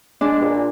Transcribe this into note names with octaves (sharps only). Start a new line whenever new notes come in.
G#3 D4
A#2